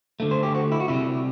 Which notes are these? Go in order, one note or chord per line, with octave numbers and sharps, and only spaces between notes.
D3 A3
C5
G4
F#4
E4
F#4
C3 G3 E4